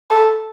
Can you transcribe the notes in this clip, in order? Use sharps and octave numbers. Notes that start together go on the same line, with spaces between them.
A4